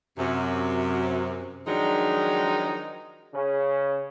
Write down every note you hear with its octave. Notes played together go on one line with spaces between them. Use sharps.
F#2 C3
D#3 F3 F#3 G#3 D4 D#4
C#3 C#4